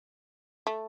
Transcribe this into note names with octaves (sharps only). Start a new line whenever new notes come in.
A3